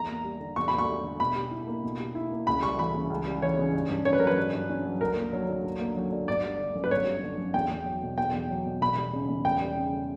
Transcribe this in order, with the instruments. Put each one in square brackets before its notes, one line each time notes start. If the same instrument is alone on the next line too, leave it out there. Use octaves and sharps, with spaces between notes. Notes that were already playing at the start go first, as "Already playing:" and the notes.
Already playing: [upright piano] E2 [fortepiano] A#5
[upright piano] A#3
G3
D3
[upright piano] E2 [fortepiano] C#6
[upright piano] A#3 [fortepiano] B5
[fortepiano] C#6
[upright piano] G3
D3
[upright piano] B2 [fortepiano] B5
[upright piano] G4
E4
A#3
B2
G4
E4
A#3
[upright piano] C#2 [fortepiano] B5
[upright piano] G3 [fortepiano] C#6
[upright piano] E3 [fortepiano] B5
[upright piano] C#3
C#2
G3
[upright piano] E3 [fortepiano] C#5
[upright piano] C#3
G2
G2
[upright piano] C#4 [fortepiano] C#5
[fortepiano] B4
[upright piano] F#3 [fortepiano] A#4
[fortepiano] B4
[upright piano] G2
G2
C#4
F#3
[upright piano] D2 [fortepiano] A#4
[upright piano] A#3
F#3
D3
D2
A#3
F#3
D3
[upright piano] G1 [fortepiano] D5
[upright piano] G3
D3
F#2
[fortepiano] B4
[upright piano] G1 [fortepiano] C#5
[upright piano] G3
D3
F#2
[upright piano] E2 [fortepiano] G5
[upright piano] E2
F#3
B2
[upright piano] E2 [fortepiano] G5
[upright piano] E2
F#3
B2
[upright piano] E1 [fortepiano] B5
[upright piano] G3
C#3
E2
[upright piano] E1 [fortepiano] G5
[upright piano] G3
C#3